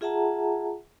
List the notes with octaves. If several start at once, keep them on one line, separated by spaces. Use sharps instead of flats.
F4 G#4 E5 F#5 A5 A#5